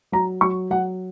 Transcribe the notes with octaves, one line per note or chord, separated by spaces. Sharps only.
F#3 A#5
F#3 C#6
F#3 F#5